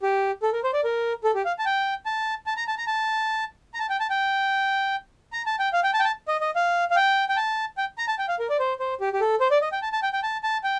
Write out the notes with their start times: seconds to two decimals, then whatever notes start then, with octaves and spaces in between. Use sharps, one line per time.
0.02 G4
0.43 A4
0.53 A#4
0.64 C5
0.74 D5
0.84 A#4
1.24 A4
1.35 G4
1.45 F5
1.59 A5
1.66 G5
2.06 A5
2.46 A5
2.57 A#5
2.67 A5
2.78 A#5
2.87 A5
3.74 A#5
3.79 A5
3.89 G5
4.00 A5
4.10 G5
5.33 A#5
5.46 A5
5.59 G5
5.73 F5
5.83 G5
5.94 A5
6.00 G5
6.04 A5
6.28 D#5
6.41 D#5
6.56 F5
6.91 F5
6.96 G5
7.29 G5
7.37 A5
7.78 G5
7.98 A#5
8.08 A5
8.19 G5
8.28 F5
8.40 A#4
8.50 D5
8.59 C5
8.80 C5
9.01 G4
9.13 G4
9.21 A4
9.40 C5
9.51 D5
9.62 D#5
9.72 G5
9.82 A5
9.93 A5
10.02 G5
10.13 G5
10.23 A5
10.43 A5
10.64 G5